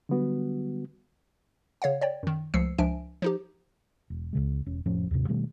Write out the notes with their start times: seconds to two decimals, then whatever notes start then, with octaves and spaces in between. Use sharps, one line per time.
0.09 D3 F#3 G3 B3 F#4
1.82 C#3 C#5 F5 F#5
2.01 C#5 D5 G5
2.23 F#2 D#3
2.54 C#2 F3 A3 E6 C7 C#7
2.78 C#2 F3 D4 E5 G#5 D7
3.22 F3 D#4 G4
4.10 E1
4.33 C#2 C#3 G#3
4.66 E1 C#4
4.86 F1 A2 F3 C#4
5.11 D#2 G#2 C3
5.28 B2 D#3 G3 A3